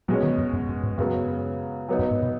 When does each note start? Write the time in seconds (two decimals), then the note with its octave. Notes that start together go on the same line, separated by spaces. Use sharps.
0.08 B2 F#3 G#3 C#4
0.23 D#3
0.38 F#2
0.53 F#2
0.69 F#2
0.83 G#2
0.98 F#2 C#3 F#3 B3
1.89 F#3 B3 D#4
1.99 F#2
2.11 G#2
2.23 B2